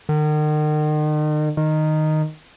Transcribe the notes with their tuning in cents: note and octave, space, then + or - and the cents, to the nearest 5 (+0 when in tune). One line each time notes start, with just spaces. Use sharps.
D#3 -40
D#3 -5